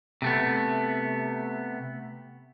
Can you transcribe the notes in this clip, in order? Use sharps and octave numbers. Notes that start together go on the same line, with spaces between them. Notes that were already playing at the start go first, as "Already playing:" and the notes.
C3 A3 B3